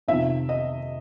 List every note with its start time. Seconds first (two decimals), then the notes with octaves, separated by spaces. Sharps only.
0.08 F2 C3 D#3 E5
0.49 D#5